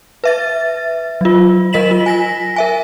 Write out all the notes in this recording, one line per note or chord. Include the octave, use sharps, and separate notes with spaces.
B4 E5 A6
F#3 F4
F#3 A#4 D#5 B6 E7 F#7
F4
G#5 A#6 B6
A#4 E5 G#5